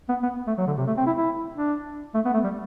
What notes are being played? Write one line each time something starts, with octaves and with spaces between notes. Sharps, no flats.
B3
B3
A3
F#3
D3
C3
A3
C4
E4
E4
D4
A3
B3
A3
G3